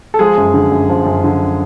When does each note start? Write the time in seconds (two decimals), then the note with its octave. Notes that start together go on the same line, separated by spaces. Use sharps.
0.14 A4
0.19 F3 G#3 G#4
0.37 F#2
0.54 D3
0.72 F#2
0.89 F3
1.06 F#2
1.24 D3